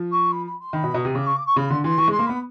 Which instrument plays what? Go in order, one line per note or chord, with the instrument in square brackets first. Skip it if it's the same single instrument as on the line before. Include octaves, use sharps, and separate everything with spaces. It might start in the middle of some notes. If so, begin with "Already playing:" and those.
Already playing: [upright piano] F3
[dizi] C#6
B5
B5
C6
[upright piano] D#3 [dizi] B5
[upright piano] B2
[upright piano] B2 [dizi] A#5
[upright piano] C3
[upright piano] C#3 [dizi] D6
[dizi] C#6
D6
C#6
[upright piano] C#3 [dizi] B5
[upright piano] D3 [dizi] C6
[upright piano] E3 [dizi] C6
[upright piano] E3 [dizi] C#6
[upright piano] G#3
[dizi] C6
[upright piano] A#3
[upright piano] B3 [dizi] B5